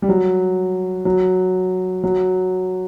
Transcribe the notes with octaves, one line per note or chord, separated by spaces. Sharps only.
G3
F#3
F#3
F#3